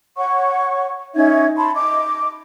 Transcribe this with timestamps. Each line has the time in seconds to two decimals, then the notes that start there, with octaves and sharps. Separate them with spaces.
0.17 C#5 F#5 C#6
1.15 C#4 D#4 E5 G#6
1.57 A5 B5 C6
1.75 D#5 D6